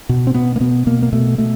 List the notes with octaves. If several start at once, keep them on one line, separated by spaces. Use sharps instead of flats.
B2
C4
B2 B3
A#3
B2 B3
B2 A#3
A#3
B2 A3
B2 A3